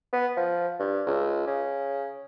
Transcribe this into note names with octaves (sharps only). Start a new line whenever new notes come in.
B3
F3
G2
C#2
C#3